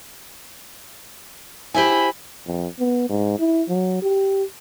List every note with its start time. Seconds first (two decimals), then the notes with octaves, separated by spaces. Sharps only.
1.75 E4 G4 C5 G#5 B5
2.46 F2
2.79 B3
3.10 G#2
3.39 E4
3.69 F#3
4.02 G4